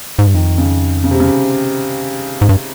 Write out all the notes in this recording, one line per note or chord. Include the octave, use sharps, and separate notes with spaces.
G#2
G2
F2 D#3
C#3
C#3
C3
C#3
G#2
G2